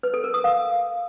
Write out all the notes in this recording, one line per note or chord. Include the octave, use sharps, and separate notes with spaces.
B4
A4
A#4
D#6
F5